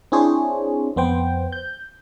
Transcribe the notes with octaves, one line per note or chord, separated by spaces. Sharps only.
C4 D4 E4 G#4 C5 C#5
F2 B3 C5 G5
G6